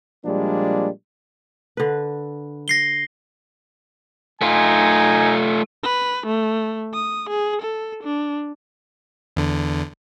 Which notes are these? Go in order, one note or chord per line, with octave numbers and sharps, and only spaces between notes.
A#2 F3 G3 G#3 A#3 D4
D3 B4
A#6 C7 G7
A3 D#4 F4 G#5
B4
A3
D#6
G#4
A4
D4
E2 D3